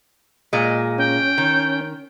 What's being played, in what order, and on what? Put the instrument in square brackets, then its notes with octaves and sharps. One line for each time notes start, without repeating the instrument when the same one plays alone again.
[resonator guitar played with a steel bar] A#2 G#3
[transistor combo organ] C#4 [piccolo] G5
[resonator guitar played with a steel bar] D#3